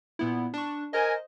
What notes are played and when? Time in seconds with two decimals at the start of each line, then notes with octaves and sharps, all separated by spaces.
0.19 A#2 B3 E4
0.54 D4 C#6
0.93 A#4 C5 D#5 G#5